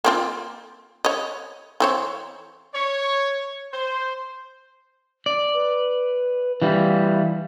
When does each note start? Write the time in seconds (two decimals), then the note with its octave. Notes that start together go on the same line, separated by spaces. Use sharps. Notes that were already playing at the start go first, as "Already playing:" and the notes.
0.04 A#3 C4 F4
1.05 C#5 D#5
1.80 E3 C4 C#5
2.74 C#5
3.73 C5
5.26 D5
5.54 B4
6.62 E3 G3 F5